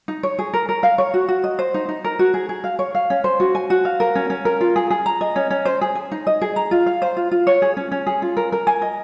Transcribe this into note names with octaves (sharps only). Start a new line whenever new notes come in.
D#4
C#5
G#4
A#4
A#4
F5
C#5
F#4
F#4
D#5
C5
D#4
D#4
A#4
F#4
G#4
G#4
F5
C#5
F5
C#4
C5
F#4
G#5
F#4
F5
A#4
C#4
C#4
A#4
F4
G#4
G#4
A#5
D#5
C#4
C#4
C5
G#4
G#5
D#4
D#5
G#4
A#5
F4
F5
C5
F4
F4
C#5
G#4
C#4
C#4
G#4
F4
A#4
A#4
G#5
D#5